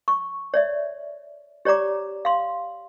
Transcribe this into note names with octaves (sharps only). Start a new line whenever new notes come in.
C#6
C#5 D5 E5
G4 C#5 D5 A#5 D6
F5 C6